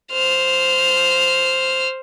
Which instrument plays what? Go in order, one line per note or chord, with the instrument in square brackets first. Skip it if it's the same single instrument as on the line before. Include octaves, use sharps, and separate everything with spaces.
[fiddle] C5 F6